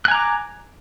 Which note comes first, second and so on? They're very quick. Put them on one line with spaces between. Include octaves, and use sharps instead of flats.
F#6 G#5 A#5 D6